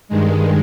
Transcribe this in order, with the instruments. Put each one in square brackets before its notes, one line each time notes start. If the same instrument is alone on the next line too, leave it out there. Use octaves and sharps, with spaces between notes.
[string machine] G2 D#3 G#3